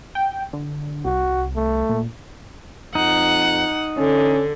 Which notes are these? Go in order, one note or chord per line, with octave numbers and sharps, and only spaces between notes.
G5
D3
C2 F#4
A3
A#2
F2 D#4 F#5
D3 C#4